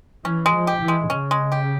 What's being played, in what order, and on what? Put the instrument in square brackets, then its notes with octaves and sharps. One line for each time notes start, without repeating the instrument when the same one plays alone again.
[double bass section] E3 [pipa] C#4
[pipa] G#3
[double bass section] F3
[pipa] G4
[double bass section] E3
[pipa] G#3
[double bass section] C#3 [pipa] C#4
[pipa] G#3
G4